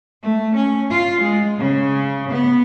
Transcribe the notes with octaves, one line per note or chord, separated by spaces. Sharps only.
A3
C#4
F4
G#3
C#3
B3